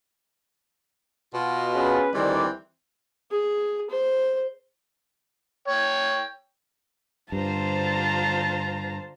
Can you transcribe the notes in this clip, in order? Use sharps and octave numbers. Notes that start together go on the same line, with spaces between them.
B2 F4
C#4 G#4 B4
D2 D#3 E3 G3 C4 D5
G#4
C5
C#5 G5
G2 D3 F4 C5 A5 A#5